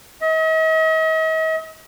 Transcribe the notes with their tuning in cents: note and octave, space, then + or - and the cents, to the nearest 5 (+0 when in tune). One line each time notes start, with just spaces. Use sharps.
D#5 +45